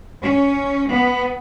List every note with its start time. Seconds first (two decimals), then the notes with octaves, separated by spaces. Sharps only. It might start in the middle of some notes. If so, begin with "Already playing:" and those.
0.22 C#4
0.90 B3